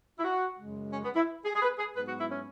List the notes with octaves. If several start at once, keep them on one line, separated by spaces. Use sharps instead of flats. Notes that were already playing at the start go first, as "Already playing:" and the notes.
E4
F#4
F#2 C#3 G#3
C#4
B3
E4
G#4
G#4
B4
G#4
G#2 F#3 B3 B4
F#4
E4
C#4